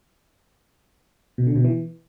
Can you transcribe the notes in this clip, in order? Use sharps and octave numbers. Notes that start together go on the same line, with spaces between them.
B2
D3
B2
E3